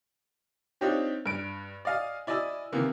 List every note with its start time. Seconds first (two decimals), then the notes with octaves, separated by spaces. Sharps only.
0.81 C4 D4 D#4 F4 G4 C#5
1.26 G2 D7
1.85 D5 D#5 F5 G#5
2.27 E4 D5 D#5 G#5 E6
2.72 C3 D#3 E3 A#3 B3